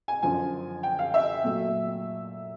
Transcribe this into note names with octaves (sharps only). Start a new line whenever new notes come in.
G#5
F#2 D3 F3 G#5
G5
F5
E5
A#2 F#3 A3